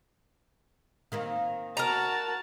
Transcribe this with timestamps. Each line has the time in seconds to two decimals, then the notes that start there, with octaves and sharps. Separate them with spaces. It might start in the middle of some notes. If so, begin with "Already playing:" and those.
1.12 D#3 A#3 C4
1.77 F#4 A#4 A5 A#5